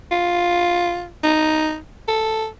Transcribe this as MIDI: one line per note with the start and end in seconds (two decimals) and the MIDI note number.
0.11 1.09 65
1.23 1.77 63
2.08 2.47 69